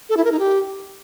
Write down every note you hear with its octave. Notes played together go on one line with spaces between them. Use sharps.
A4
E4
A#4
D#4
G4